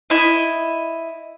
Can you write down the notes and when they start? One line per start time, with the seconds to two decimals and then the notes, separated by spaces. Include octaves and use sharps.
0.10 E4 D#5